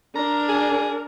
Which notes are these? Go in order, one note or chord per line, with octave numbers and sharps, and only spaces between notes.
D4 A#4 A#5
G#4